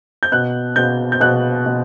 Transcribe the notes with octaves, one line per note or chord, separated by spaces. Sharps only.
G6
B2 F#6
B2 G6
G6
B2 F#6
B2